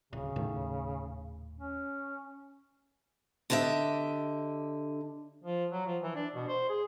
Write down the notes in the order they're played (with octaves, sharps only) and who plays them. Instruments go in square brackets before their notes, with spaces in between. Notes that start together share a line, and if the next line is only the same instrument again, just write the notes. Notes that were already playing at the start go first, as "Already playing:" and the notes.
[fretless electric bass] D1 [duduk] C#3
[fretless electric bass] D#1 A2 D#3
[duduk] C#4
[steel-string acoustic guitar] D3 D4 G4 D#5 E5
[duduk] F3
F#3
F3
E3
D4
B2
C5
G#4